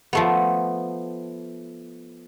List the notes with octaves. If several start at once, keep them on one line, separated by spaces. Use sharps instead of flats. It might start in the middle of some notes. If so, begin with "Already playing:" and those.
F3 A3 B3